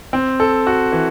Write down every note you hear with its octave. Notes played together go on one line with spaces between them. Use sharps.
C4
A4
F#4
E3